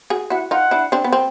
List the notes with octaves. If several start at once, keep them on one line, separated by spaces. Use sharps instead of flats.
F#4 G#4
E4 F#4 F#5
D#4 F4 F#5
D4 E4
C4 D4
B3
C4